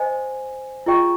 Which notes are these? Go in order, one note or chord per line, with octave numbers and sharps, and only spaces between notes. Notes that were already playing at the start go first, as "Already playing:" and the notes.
Already playing: C5 D#5 G#5
F4 G#4 D#5 G5 C#6